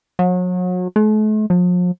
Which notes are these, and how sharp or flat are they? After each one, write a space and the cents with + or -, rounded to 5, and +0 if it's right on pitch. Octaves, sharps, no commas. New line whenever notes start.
F#3 -35
A3 -45
F3 +40